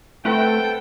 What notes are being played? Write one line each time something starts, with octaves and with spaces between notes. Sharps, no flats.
A3 C4 A4 B4 F#5 G5